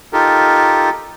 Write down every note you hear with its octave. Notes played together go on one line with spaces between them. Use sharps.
D#4 F4 G4 A4 A#4